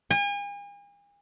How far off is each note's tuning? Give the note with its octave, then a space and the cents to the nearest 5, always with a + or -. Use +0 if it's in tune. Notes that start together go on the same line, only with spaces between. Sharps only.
G#5 -40